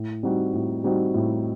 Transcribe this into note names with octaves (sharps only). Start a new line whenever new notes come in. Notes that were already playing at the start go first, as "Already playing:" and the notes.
Already playing: A2
G3 C4 D#4 F#4
A2
G3 C4 D#4 F#4
A2